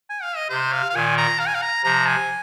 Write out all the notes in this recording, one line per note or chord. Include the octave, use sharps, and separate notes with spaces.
G#5
F5
D#5
C3 C5
F5
F5
A#2 D#3 G#5
A#5
F5
G#5
F5
A#5
C3 F3 A#5
G#5